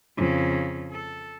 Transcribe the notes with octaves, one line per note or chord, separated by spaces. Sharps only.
F2 C#3
A4